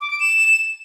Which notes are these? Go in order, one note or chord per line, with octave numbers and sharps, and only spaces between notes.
D6
D7
E7